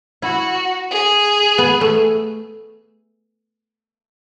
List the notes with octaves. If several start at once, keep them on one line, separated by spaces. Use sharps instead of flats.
E4 F#4
G#4
B3
A3